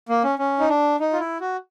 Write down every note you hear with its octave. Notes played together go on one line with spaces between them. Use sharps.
A#3
C#4
C#4
D#4
D4
D#4
F4
E4
F#4